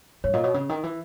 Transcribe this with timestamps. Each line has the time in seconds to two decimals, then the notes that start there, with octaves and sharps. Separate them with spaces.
0.24 G2 C#5
0.34 A#2 D#5
0.44 B2 C#5
0.54 C#3
0.69 D#3
0.83 E3